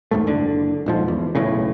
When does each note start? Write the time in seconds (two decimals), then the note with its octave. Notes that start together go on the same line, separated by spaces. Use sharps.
0.11 D#2 G#2 A3
0.27 F#1 D3
0.86 D#1 G#2 F3
1.08 E2
1.35 D#1 B1 A2 C#3